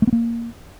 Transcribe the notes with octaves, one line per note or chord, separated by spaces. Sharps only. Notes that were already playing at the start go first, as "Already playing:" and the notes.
A3
B3
A#3